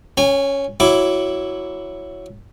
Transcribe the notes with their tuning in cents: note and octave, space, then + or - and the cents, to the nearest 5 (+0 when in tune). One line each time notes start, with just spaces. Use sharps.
C#4 +0 G#5 -40
F#3 +0 E4 +5 D6 -15